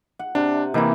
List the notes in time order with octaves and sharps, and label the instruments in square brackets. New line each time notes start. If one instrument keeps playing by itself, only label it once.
[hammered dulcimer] F#5
[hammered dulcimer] C3 [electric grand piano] D4
[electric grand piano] C3 E3 A#3 [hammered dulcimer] D#4 E4